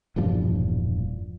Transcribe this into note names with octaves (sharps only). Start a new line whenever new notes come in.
E1 G2 A#2 F3